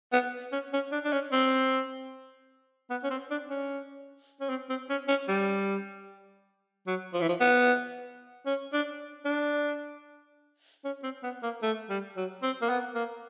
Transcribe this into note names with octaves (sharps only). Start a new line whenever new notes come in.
B3
C#4
C#4
D4
D4
C#4
C4
B3
C#4
C4
D4
C#4
C#4
C4
C4
C#4
C#4
G3
F#3
F3
E3
F3
B3
C#4
D4
D4
C#4
C4
B3
A#3
A3
G3
F#3
C4
A#3
B3
A#3